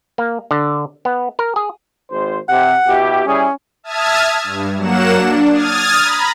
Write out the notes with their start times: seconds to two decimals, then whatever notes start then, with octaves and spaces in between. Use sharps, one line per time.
0.18 A#3
0.51 D3
1.05 B3
1.39 A#4
1.56 G#4
2.10 G#1 C5
2.49 C3 G4 F#5
2.87 B2 E4 G4
3.27 G3 C#4 E4 G#4
3.83 E5 A5 D#6 F6 G#6
4.44 G2
4.78 F#3 A#3 F#5 E7
5.12 D4
5.51 D#6 F6 G#6 A6
6.01 A#5 B5